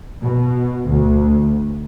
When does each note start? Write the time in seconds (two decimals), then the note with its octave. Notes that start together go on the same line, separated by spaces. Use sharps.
0.22 B2
0.87 D2